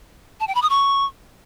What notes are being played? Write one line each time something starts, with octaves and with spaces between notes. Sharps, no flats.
A5
G5
B5
D#6
C#6